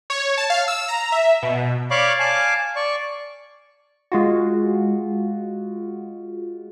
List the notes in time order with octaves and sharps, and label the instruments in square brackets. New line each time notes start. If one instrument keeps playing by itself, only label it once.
[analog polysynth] C#5
A5
F5
E6
A#5
E5
B2
[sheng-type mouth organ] C#5 D5 F5 B5 C#6 D6
F5 G#5 A5 D6
D5 C#6
[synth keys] G#3 F4 F#4